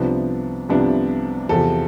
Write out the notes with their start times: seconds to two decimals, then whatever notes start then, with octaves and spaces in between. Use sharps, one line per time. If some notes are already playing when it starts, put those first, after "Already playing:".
Already playing: C2 C3 F3 B3 D4
0.69 C2 C3 F3 B3 D4
1.49 E2 C3 F3 A4